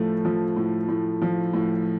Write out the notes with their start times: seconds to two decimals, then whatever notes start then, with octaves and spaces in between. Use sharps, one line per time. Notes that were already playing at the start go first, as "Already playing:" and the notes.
Already playing: A2 F3 A3
0.25 F3
0.56 A2
0.88 A2
1.22 F3
1.54 A2